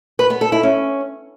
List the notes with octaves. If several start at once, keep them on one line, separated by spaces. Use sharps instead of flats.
B4
B3
A4
E4
C#4